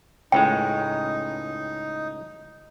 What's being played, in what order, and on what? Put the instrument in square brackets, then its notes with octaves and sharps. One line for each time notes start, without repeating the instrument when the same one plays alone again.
[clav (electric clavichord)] C#2 A2 G#3 [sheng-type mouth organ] D#4 [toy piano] G5